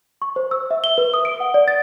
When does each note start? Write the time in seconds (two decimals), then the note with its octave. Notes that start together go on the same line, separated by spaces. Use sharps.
0.22 C#6
0.36 C5
0.51 E6
0.71 E5
0.84 G7
0.98 B4
1.14 D#6
1.25 D7
1.40 F#5
1.54 D5
1.68 A6